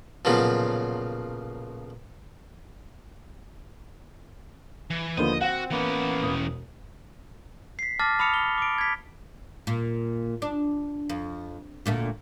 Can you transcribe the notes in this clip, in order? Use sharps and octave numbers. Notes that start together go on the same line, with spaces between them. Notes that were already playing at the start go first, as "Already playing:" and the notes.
B1 A#2 C#3 F3 F#3
E3
D#2 D3 F3 B3 C5 D#5
C4 F#4 F#5
E3 A#3 B3 C#4
E1 D#6
B6 C7
A5 D6 F6 A6 A#6
A5 B5 D#6 F6 C#7 F7
G7
D6 D7
G#6 B6
A#2
D4
F2
D2 A#2 A3